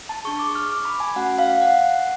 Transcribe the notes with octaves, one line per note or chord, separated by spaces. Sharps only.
A5
D4 G#4 C#6
D6
F6
D6
B5
G#5
A3 C#4 F#4 F#5
F5
F#5